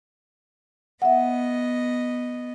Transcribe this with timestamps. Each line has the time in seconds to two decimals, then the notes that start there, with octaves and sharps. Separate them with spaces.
1.02 B3 D#5 E5 F#5